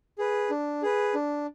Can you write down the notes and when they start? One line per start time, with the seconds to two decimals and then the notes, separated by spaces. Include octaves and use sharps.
0.18 G#4 B4
0.50 D4
0.82 G#4 B4
1.14 D4